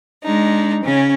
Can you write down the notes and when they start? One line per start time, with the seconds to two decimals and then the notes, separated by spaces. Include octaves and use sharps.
0.23 G#3 D4 D#4
0.83 C#3 C#4